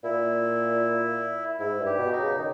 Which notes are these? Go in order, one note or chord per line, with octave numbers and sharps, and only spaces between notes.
A#2 E4
G#2 E4
G2
G4
B2
D#4
C#3
D#3